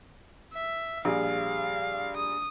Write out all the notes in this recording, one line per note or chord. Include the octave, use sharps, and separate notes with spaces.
E5
A#1 G3 G#4 F5
D#6